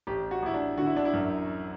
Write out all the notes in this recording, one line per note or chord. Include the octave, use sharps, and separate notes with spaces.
A1 G4
F#4
A1 E4
D4
D3 F#4
E4
D4
E4
F#2